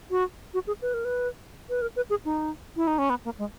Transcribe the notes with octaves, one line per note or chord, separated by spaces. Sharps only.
F#4
F#4
G#4
B4
A#4
B4
B4
A#4
B4
G#4
D#4
E4
D#4
C#4
B3
A#3
G#3